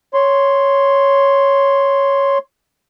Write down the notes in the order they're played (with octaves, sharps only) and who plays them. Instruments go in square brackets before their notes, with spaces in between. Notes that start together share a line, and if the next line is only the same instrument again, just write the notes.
[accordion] C#5 C6